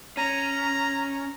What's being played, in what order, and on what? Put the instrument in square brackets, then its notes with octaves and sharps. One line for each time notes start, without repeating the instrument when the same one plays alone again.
[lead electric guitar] C#4 [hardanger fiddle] A#5